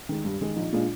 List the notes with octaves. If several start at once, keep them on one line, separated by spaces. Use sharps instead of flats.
D#3 G#3
G2
D#3 G#3
A#1 D#4
A#2 G#3 D4 F4